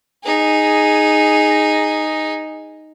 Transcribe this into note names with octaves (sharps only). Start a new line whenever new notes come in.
D#4 G#4